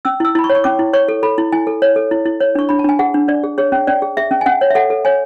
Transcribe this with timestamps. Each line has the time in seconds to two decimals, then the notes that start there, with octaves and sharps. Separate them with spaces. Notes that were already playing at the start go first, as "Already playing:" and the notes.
0.05 C#4 E6
0.20 E4 E6
0.35 E4 B5
0.44 C#6
0.50 C#5
0.55 C#6
0.64 C#4 D6
0.79 E4
0.93 C#5 C#6
1.08 A4
1.23 A4 B5
1.38 E4
1.52 E4 G#5
1.67 A4
1.82 C#5
1.96 A4
2.11 E4
2.25 E4
2.40 C#5
2.55 D4 C#6
2.69 D4 B5
2.79 A5
2.84 D4 G#5
2.99 G#4 F#5
3.14 D4
3.28 D4 D5
3.44 G#4
3.58 G#4 C#5
3.72 C#4
3.87 C#4 D5
4.02 G#4
4.17 G#4 E5
4.31 C#4
4.41 G#5
4.46 C#4 F#5
4.61 C#5
4.70 E5
4.75 A4 F#5
4.90 A4
5.05 C#5 G#5